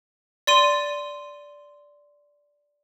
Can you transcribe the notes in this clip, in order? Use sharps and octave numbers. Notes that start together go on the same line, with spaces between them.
D5 C6 D#7